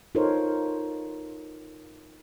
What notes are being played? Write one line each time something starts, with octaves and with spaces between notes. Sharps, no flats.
D#4 F4 A4 A#4 C5 C#5